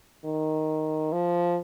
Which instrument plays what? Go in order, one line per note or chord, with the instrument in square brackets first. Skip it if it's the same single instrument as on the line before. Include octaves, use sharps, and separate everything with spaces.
[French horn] D#3
F3